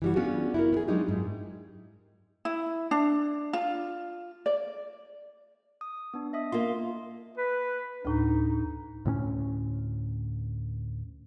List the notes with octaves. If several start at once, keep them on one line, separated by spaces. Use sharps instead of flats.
E3 G3 F#4
B3 C#4 D4 F4 F#4 G#4
E4 F#4 A#4
B3 G#4
F#3 G#3 D4 D#4 F4 G4
G#2
E4
D4
F4
D5
D#6
B3 D4
D#5 E5 D#6
A#3 F4 C6
B4
D2 A2 D#4
D2 A2 C4 C#4